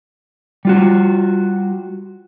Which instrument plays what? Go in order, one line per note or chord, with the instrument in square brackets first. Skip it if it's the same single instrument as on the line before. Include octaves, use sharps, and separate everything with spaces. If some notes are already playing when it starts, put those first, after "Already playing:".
[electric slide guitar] G3 F4 F#4